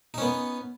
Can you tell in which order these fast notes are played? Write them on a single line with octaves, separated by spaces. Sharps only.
D#4 C#4 B3